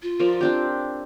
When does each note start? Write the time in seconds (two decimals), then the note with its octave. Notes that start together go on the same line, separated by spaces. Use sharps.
0.02 F4
0.19 F3 A#4 D5
0.41 C4 D4 G4